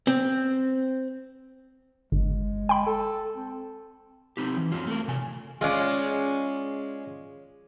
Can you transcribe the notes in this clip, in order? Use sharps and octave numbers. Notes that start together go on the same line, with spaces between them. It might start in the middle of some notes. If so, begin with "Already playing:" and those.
C4
G1 G#3
G5 B5
A4
C4
C4 D#4 G4
E3
F#2 D#3 F#3 C4 F4
A3 A#4
C3 G#5
G#3 C#4 F4 D5